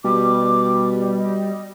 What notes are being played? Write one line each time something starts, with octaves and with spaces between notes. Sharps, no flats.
B2 G3 D6
D#5